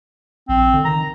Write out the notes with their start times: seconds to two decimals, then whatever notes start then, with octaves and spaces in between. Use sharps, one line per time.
0.49 A#1 C4
0.74 D3
0.85 D#3 A#5